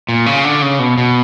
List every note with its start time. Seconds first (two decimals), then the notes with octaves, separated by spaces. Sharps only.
0.09 A#2
0.26 C#3
0.44 D3
0.62 C#3
0.79 B2
0.98 B2